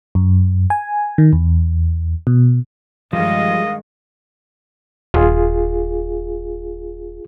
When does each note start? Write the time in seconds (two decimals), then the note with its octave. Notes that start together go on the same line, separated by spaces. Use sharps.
0.15 F#2
0.70 G#5
1.18 D#3
1.33 E2
2.27 B2
3.13 G2 D#3 F3 G3 G#3 D#5 F5
5.14 D#1 F4 G#4